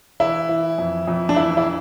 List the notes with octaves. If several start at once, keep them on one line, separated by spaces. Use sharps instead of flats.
E3 E4
E3
F2
F2
D4
E3 E4
E4